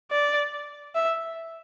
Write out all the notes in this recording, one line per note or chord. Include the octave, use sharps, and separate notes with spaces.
D5
E5